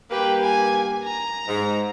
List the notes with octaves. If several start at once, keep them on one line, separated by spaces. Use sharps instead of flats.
G2 A#3 G4 B4 G5
G#5
A#5
G#2